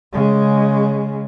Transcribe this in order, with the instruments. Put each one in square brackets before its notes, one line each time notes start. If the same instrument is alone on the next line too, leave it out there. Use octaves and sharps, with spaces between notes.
[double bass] C#3 G#3